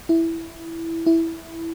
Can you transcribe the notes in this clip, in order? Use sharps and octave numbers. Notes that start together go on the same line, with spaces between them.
E4
E4